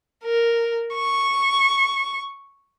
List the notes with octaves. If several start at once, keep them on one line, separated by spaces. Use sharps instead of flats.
A#4
C#6